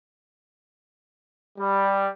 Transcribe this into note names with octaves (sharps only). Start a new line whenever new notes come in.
G3